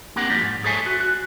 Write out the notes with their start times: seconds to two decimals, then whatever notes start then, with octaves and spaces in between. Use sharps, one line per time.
0.16 A#3 C4 D4 G4 A#4 F#5
0.30 G2 F3 G3
0.41 G#2
0.64 G#4 A4 C5 C#5 E5 G#5
0.86 F#4
1.00 F#4